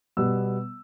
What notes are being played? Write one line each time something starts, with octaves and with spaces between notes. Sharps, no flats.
B2 G3 B3 E6